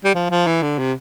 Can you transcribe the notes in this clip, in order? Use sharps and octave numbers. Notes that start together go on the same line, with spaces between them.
G3
F3
F3
E3
D3
C3